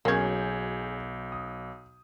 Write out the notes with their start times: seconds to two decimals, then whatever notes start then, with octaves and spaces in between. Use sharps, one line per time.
0.05 B1 F#3 A#3 C#4 G#4 G6 G#6
1.32 D#6